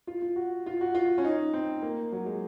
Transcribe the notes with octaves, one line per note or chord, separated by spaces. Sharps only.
F4
F4
F#4
F4
F#4
F4
C#4
D#4
C4
A#3
F#3
G#3